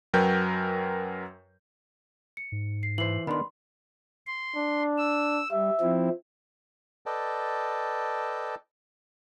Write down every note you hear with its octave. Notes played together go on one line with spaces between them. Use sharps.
F#2 F#3 A#4 B4 G5 G6
C#7
G#2
C7
E3 C5 C7 F#7
D#3 B3 D4 B5 C6
C6
D4
E6
G3 E5
F3 C4 E4
A4 B4 D5 D#5 G5 A5